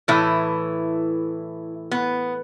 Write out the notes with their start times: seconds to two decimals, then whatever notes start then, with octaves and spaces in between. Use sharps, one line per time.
0.08 A2 E3 A3 E4
1.91 B3